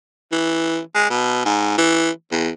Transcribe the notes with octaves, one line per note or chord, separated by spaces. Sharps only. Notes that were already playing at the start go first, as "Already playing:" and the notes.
E3
G#3
B2
G#2
E3
E2